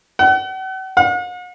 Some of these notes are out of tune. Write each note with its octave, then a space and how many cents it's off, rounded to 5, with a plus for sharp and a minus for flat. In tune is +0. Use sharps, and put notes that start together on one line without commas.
F#5 +40
F#5 -45